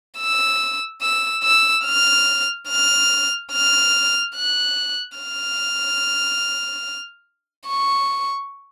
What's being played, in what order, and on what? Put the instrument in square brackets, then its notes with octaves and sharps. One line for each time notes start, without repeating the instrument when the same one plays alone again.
[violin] E6
E6
E6
F6
F6
F6
F#6
F6
C#6